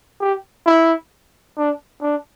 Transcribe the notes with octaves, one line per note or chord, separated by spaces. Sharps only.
G4
E4
D4
D4